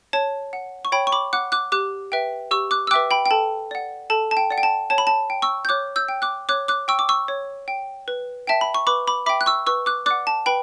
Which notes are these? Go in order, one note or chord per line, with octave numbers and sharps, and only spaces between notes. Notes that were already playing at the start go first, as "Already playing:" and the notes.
C#5 A5
F#5
C#6
C#5 G5 B5
C#6
B5 D6
F#5 D6 F#6
D6 F#6
G4 D6 F#6
B4 E5 G5
G4 C#6 E6
D6 F#6
E6
B4 E5 G5 D6 F#6
G5 B5
G5
A4 A5
D5 F#5
A4 A5
A5
G5
D5 F#5
G5
A5
C#5 A5
B5
A5
G5
C#6 E6
G6
C#5 D6 F#6
E6 G6
G5
D6 F#6
C#5 D6 F#6
D6 F#6
G5 C#6 E6
D6
C#6 E6
C#5
G5
B4
E5 G5 A5
B5
C#6
B4 B5 D6
B5 D6
E5 G5 B5 D6
F#6
C#6 E6
B4 C#6 E6
D6 F#6
D5 F#5 D6 F#6
A5
B4 G5 B5